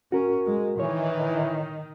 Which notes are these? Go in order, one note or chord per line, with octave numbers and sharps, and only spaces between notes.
C#4 F#4 A#4
G#3
D#3 E3 C#5